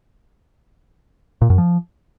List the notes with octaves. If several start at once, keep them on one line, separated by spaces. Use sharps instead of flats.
A#2
F#2
F3